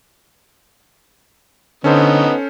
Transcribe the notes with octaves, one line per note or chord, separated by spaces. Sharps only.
D3 B3 C#4 D#4 A4 C5